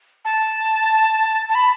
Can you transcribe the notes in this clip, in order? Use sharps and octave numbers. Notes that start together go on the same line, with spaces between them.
A5
A5
B5